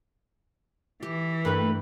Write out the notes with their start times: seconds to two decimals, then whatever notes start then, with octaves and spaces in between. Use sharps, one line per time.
1.03 E3 G4
1.45 G2 A3 A#3 B4 G5 F#6